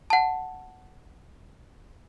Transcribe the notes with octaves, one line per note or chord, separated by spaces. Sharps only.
F#5 A5